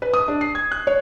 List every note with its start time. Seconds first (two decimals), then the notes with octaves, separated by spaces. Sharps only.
0.02 B4
0.14 D#6
0.28 D4
0.41 C7
0.55 G#6
0.72 F#6
0.87 C#5